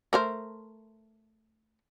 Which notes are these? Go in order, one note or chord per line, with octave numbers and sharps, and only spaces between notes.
A3 A#4 C5